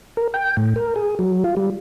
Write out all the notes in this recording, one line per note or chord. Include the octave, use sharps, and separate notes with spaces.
A#4
G5
A2
A#4
G#4
F#3
F4
G3